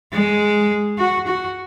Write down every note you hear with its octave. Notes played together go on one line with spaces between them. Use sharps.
G#3
F#4
F#4